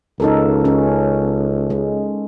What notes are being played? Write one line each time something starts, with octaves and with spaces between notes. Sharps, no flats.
C#2 D#4 A4 A#4
C#4
G#3